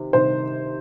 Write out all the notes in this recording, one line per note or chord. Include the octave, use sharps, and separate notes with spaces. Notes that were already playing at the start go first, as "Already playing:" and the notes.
Already playing: C3 D#3
C3 D#3 G3 C5